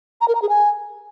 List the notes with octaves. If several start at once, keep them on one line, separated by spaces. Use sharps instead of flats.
A#5
A#4
A#5
G#4
G#5